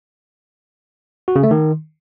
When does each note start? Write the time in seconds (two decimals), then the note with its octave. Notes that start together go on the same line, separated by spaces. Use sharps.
1.28 F#4
1.36 C#3
1.43 A3
1.51 D#3